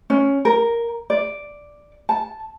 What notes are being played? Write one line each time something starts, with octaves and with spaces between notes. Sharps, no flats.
C#4
A#4
D5
A5